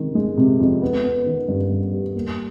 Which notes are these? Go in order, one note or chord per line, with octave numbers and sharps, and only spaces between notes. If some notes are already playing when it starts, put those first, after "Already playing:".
Already playing: C3 D#3 G#3
G#3
C3
F2
B3
B3
D#3
G2
B3
G3
A#3